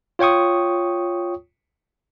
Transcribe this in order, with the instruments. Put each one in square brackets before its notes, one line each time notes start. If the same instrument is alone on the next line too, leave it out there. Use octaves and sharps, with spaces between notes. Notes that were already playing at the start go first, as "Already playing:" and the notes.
[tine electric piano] F4 C#5 G5 C#6 D#6